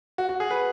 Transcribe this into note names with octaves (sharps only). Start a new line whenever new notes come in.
F#4
F#4
G#4
B4